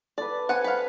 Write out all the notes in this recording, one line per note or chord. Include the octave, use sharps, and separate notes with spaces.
A4 B4 D5
C4 F#5 G#5
B4 F5